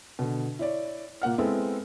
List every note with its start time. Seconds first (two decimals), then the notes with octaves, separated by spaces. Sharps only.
0.19 B2 D3
0.59 E4 C#5 D5
1.22 A#2 A#3 F#5 F6
1.38 G#3 B3 C4 E4 A4